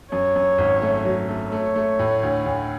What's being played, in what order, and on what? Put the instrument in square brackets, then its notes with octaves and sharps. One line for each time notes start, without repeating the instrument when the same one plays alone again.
[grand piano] F#2 [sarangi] C#5
[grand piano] F#2
G#1
A3
F#3
A3
[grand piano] A3 [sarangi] C#5
[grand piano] A3
A2
D2
D2